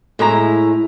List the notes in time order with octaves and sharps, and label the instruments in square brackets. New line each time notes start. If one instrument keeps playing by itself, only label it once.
[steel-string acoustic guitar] A2 G#3 E4 A#5